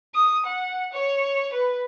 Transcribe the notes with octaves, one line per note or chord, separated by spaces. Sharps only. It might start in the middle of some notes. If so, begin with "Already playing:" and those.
D#6
F#5
C#5
B4